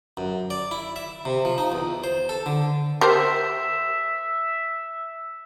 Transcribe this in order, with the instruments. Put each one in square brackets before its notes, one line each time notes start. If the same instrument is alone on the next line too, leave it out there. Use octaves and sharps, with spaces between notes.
[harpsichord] F#2
D5
E4
E5
C3
F3
D#4
E2
C5
A4
D3
[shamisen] G4 A#4 C5 [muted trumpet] E5